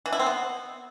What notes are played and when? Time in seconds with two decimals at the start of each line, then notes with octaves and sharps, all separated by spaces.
0.06 E3
0.12 E4
0.19 C4
0.26 B3